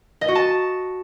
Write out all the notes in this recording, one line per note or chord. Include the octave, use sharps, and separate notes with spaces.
D#5
F#4
A5